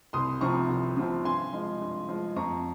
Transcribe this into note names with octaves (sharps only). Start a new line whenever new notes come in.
C2 C6 D#6
C3 F3 C4 A#5 C#6
C2
C3 F3 C4
G2 G#5 C6
F3 G#3
G2
F3 G#3
F2 A#5 C#6